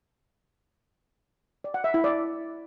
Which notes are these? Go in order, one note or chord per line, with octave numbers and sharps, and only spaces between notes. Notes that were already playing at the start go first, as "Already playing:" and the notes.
D5
F#5
E5
E4
D5